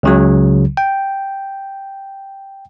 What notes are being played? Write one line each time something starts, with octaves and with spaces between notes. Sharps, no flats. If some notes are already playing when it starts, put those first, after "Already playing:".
C#2 C#3 F#3
G5